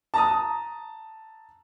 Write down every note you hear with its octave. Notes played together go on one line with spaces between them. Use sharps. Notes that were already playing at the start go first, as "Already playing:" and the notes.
A5 A#5 D#6